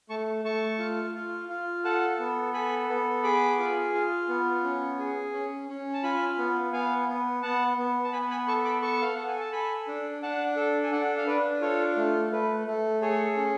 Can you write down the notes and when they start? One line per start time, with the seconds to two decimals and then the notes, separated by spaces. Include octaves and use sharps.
0.10 A3 A5 C#6
0.44 A3 A5 C#6
0.79 F4
1.14 F4
1.49 F4
1.84 A4 F#5 A5
2.19 B3
2.53 A4 G#5 B5
2.89 B3
3.23 G#4 B5 D6
3.59 F4
3.94 F4
4.29 B3
4.64 C#4
4.99 G#4
5.33 C#4
5.69 C#4
5.94 A5
6.03 F4 G#5 B5
6.38 B3
6.73 B3 F5 G#5
7.09 B3
7.43 B3 F#5 A5
7.78 B3
8.04 A5
8.13 B3 G#5 B5
8.31 G#5 B5
8.48 A4 A5 C#6
8.65 B5 D6
8.82 A4 A5 C#6
9.02 F5
9.15 A4 F#5
9.28 G#5
9.40 A5
9.52 A4 G#5 B5
9.88 D4
10.22 D4 F#5 A5
10.57 A4
10.83 G#5
10.92 D4 D5 F#5
11.18 F5
11.27 D4 B4 D5
11.61 F4 A4 C#5
11.97 A3
12.32 A3 B4
12.67 A3
13.01 G#4 A4 C#5
13.37 C#4